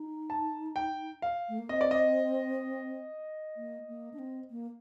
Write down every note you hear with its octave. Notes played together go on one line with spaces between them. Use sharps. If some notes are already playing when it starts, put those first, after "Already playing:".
Already playing: D#4
A5
G5
F5
A3
A#3
C4 D#5
D5
D#5
A#3
A#3
D4
C4
A#3